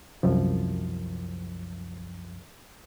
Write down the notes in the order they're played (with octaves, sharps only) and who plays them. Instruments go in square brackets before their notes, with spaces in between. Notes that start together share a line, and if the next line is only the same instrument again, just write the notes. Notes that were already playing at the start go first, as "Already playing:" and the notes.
[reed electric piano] C2 F#2 F3